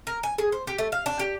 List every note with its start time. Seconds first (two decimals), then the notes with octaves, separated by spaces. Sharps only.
0.07 A#4
0.23 G#5
0.38 G#4
0.52 C5
0.67 G4
0.78 A3
0.92 F5
1.06 D4
1.19 G4